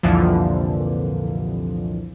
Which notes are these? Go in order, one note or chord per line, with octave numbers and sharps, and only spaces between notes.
C2 F2 A#2 D3 E3 F3